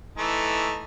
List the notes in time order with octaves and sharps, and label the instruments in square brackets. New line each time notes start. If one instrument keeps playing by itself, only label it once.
[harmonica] E3 A3 D#4